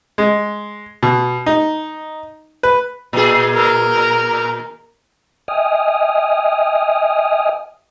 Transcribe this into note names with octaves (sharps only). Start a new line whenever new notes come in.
G#3
B2
D#4
B4
A#2 G#4
A#4
D#5 E5 G5 G#5 D#6 F6